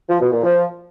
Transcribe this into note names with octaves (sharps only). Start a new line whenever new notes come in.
F3
B2
A#2
F3